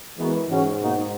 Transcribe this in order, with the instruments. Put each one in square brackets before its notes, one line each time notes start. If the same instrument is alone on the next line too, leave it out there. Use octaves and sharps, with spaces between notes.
[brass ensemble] E3 [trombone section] G#3 B3 F#4 A#4
[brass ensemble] G#2 [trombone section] C#3 G#3 C#4 F#4
[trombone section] B2 A#3 D#4 F#4